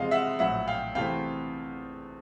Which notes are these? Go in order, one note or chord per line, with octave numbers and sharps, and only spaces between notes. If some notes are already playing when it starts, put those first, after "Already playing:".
Already playing: E2 C3 F3 G#3 C4 D#5 F5
E5 F#5
A#1 A2 F#3 E5 F#5
F5 G5
E2 C3 E3 A3 C4 F5 G5